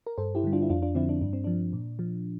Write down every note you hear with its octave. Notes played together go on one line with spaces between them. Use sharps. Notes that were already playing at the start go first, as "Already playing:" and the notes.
A#4
G2 A4 C5
E4 G4
D3 G3
D4 F4
E4
F2 D4 F4
D4 F4
D3 F3 C4 E4
D4
G2 D4
C4
F3 D4
A#2
F3